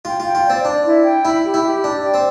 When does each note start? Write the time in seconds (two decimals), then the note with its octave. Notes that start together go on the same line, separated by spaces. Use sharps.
0.05 F4 G5
0.20 F4
0.25 G5
0.35 F4
0.45 C4 D5
0.64 D4 D5
0.85 E4
1.05 G5
1.25 E4 B5
1.44 G4
1.54 E4
1.64 G4
1.84 D4 D5
2.04 G5
2.14 C4